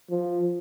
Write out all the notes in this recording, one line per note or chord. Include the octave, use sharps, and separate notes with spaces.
F3